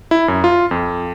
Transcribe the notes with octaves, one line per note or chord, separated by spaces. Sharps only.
E4
F#2
F4
F2